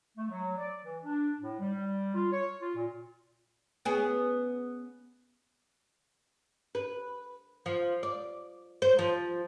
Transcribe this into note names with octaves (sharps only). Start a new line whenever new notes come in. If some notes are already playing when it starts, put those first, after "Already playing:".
A3
F#3
D5
E3
D4
A2
G3
F4
C#5
F4
A#2
B3 C#4 G#4
B4
F3
D5
C5
F3